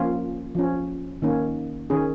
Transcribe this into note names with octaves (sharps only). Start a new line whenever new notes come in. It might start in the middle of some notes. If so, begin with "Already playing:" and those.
Already playing: F3 A#3 C#4 F4
F3 C#4
D#3 A#3 C#4
D#3 C#4 G#4